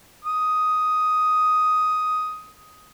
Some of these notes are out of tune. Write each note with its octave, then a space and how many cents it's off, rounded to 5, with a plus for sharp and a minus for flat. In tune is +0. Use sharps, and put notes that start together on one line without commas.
D#6 +5